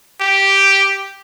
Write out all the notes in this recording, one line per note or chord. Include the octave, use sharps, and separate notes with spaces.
G4